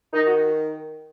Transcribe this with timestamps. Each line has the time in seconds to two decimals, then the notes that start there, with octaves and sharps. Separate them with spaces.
0.12 D#3 D#4
0.26 F#4